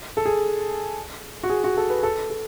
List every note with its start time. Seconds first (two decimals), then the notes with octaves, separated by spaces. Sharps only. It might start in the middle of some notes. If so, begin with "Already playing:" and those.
0.17 A4
0.26 G#4
1.43 F#4
1.50 G#4
1.64 F#4
1.77 A4
1.90 B4
2.03 A4
2.30 A4